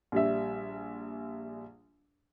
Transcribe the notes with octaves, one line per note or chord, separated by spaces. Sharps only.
A#1 G3 E5